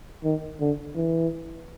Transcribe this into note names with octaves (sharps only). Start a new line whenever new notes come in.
D#3
D3
E3